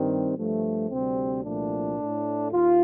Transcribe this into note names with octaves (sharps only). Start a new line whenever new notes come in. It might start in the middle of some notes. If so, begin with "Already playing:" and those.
Already playing: G2 D#3 G3 C4
G2 F3 A3
D2 C3 G3 C4
C2 A#2 F3 A3 D4
A2 A3
D#2 F4